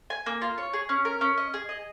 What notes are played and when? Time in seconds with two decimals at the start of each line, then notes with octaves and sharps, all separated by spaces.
0.10 G#5
0.26 A#3
0.42 F4
0.58 C#5
0.73 G#4
0.89 C#4
1.05 A#4
1.21 C#4
1.37 D#5
1.54 G#4
1.69 D#5